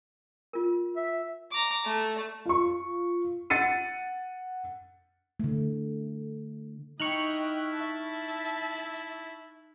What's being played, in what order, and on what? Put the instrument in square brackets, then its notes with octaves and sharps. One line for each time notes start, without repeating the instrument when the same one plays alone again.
[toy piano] F4 A#4
[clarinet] E5
[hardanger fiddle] A#5 D6
A3
[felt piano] F4 C#6
F#5 A6 C#7 D#7
[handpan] D3 A3
[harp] D#4 [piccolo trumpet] E4 [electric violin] D#5 G5 [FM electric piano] C#6 F6 F#6
[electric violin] E5 A5